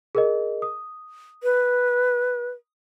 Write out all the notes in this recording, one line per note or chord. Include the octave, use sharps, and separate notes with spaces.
G#4 A#4 D#5
D#6
B4